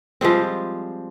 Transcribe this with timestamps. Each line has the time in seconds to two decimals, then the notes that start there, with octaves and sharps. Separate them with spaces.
0.21 F3 G3 G#3 C4